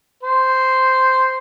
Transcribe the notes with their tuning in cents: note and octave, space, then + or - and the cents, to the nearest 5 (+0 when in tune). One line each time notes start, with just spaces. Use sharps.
C5 -5